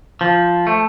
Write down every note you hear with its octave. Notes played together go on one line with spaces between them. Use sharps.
F3
A3